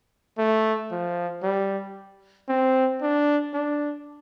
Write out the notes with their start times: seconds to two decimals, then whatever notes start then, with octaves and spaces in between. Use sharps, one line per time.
0.38 A3
0.91 F3
1.43 G3
2.49 C4
3.02 D4
3.54 D4